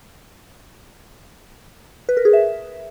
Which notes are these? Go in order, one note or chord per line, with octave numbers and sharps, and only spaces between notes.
B4
A#4
G#4
E5